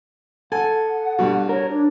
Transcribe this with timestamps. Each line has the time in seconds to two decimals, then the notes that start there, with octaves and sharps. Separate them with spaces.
0.52 A4 F#5 G#5
1.19 G2 B2
1.49 A#4 C#5
1.68 D4